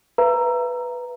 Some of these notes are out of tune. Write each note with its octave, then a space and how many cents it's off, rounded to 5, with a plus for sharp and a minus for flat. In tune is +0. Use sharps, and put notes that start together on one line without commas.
B4 +0 E5 +45 A#5 +0